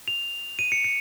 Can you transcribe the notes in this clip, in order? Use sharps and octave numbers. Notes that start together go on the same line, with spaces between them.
F7
D#7
C#7
C#7